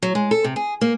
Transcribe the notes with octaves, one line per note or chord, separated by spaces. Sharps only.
F#3
G#3
A4
C3
G#4
A#3